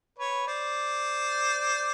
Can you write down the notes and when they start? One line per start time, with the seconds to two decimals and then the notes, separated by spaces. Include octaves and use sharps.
0.18 B4 C#5
0.47 C5 D5